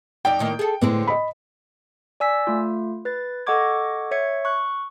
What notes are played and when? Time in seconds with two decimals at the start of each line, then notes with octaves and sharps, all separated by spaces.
0.25 F2 D#4 D5 G5
0.39 A2 D#3 A#3
0.59 G#4 A4
0.82 A2 D3 G#3 C4 B4
1.07 D#5 B5
2.20 D5 G#5 E6 B6
2.47 A3 F4
3.05 B4 A6
3.47 A4 D#5 F#5 C#6 D6 G#6
4.11 C#5 E5 G#6 C#7
4.45 C#6 F#6